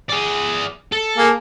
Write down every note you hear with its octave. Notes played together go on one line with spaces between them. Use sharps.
G#4 D5
A4
A#3 G#4